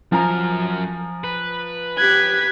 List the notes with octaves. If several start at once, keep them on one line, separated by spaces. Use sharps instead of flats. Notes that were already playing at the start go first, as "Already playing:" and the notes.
F#2 F3 A#4 G#5 A#5
B4
G4 F#6 G#6 B6